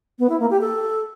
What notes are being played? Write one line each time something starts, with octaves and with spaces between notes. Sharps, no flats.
B3
E4
A#3
G4
A4